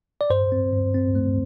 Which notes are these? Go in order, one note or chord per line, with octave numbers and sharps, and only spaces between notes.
D5
G2 C5
C4
G2
C4
A3